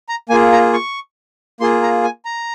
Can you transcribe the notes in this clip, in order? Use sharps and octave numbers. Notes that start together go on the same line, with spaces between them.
A#5
A#3 F4 G#4 G#5
A#5
C#6
A#3 F4 G#4 C6
A#5
G#5
A#5